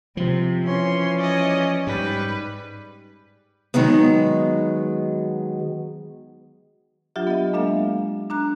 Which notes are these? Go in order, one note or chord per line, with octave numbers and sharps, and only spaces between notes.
C3 F3
E3 C#4 C#5 C6
D5 D#5
G#2 G3 B4
D#3 F#3 G#3 B3
F#3 D4 F4 G4 E5
B3 D#5
G#3 A#3 D4 A4 E5 F5
D4 A#5 F#6